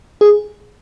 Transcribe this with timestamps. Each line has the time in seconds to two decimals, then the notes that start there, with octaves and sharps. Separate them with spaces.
0.21 G#4